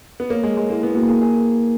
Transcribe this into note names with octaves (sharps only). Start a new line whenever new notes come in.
B3
A#3 C#5
G#3
G#4
G#3
A#3 E4
B3
A#3
F#4
G#4 A#4
G#4